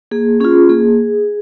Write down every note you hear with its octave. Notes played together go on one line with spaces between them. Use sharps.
A#3 G#4
C#4 F4 G#4
A#3 G#4